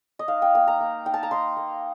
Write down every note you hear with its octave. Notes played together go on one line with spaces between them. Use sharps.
D#5
D#4 F5
G5
A#3 G5
A#5
A#3
D#4 G5
A5
A#5
D#4 C6
A#3